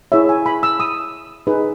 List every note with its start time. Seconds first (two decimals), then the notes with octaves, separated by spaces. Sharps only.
0.12 E4 G#4 C#5 E5
0.29 G#5
0.46 B5
0.63 E6
0.80 D#6
1.47 D#4 G#4 B4